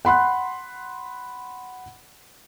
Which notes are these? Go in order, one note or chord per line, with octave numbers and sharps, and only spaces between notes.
F#5 B5 C6 F#6